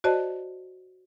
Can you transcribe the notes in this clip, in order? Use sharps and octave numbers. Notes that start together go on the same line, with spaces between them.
F#4 C5 D5 D#5 A5